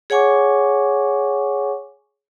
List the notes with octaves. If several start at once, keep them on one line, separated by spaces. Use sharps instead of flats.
G#4 C#5 F#5 G#5 C#6 D6